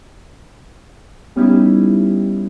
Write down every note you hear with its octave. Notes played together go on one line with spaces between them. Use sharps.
G3 B3 C#4 D#4 E4 G4